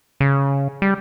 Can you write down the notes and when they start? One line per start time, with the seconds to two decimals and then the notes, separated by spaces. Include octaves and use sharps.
0.20 C#3
0.82 G3